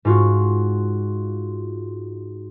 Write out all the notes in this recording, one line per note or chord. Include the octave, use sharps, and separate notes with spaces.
G#2 F4 F#4